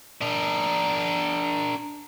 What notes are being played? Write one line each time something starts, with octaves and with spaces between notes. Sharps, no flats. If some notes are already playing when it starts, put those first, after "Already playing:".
D4 A#4